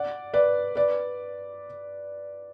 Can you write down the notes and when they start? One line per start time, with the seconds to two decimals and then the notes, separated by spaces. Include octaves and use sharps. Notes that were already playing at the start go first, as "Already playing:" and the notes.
Already playing: D5 F#5
0.33 B4 D5
0.76 B4 D5